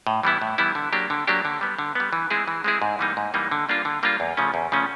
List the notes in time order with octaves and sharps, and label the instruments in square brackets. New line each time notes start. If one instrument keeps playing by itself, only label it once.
[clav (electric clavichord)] A2
E3 G3 B3 E4
A2
E3 G3 B3 E4
D3
F#3 A#3 D4 G4
D3
F#3 A#3 D4 G4
D3
G3 B3
D3
G3 B3
E3
G#3 C4 E4 G#4
E3
G#3 C4 E4 G#4
G#2
E3 G3 A#3 D#4
G#2
E3 G3 A#3 D#4
D3
G3 A#3 D4 F4
D3
G3 A#3 D4 F4
E2
C#3 F3 A3 C#4
E2
C#3 F3 A3 C#4